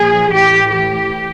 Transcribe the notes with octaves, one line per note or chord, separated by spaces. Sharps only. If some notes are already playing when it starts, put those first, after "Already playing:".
Already playing: A#2 F3 G#4
A2 E3 G4
G4